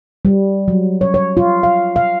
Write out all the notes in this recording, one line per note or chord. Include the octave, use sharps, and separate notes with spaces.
G3
F#3
C#5
C#5
F4
F5
F5